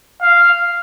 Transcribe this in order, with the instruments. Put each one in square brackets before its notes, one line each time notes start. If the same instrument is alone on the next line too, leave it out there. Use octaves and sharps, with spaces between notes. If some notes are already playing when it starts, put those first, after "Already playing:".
[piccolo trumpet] F5